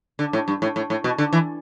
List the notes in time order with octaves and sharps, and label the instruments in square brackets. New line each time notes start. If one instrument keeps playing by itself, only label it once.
[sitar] D3
A2
G2
A2
A2
A2
B2
D3
E3